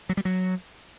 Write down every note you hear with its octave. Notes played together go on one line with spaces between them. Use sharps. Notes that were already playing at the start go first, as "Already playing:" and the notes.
F#3
G3
F#3